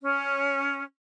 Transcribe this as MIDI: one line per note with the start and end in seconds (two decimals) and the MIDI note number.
0.03 0.83 61